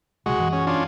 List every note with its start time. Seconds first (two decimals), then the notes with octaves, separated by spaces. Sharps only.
0.26 A#1 C3 G#3 F#4
0.38 F#2 E3
0.53 C#4
0.67 C#4 D4 F4